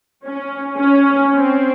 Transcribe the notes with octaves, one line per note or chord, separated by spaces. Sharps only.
C#4
C#4
C4